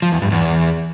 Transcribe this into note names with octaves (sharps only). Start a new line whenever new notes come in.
F3
E2
G2
E2